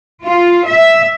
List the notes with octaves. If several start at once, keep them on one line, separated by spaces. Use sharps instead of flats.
F4
E5